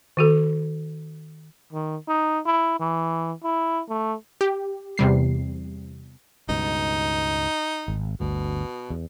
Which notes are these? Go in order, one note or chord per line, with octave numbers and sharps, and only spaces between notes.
D#3 F#4 A4
D#3
D#4
E4
E3
E4
A3
G4
E2 C3 G3 C7
C#2 G2 B2 D#4
G#1
G1 D2 B2
E2